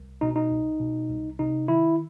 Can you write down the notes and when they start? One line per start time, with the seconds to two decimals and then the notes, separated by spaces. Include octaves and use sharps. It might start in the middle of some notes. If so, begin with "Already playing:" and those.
Already playing: C2
0.21 B2 D#4
0.36 D#4
0.51 C2
0.80 B2
1.10 C2
1.39 C3 D#4
1.68 D#3 E4